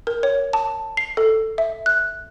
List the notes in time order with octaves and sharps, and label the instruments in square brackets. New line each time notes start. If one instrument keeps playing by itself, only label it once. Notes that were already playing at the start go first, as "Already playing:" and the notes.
[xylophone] A#4
C#5
A5
C7
A4
E5
F#6